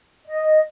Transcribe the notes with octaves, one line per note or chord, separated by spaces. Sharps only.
D#5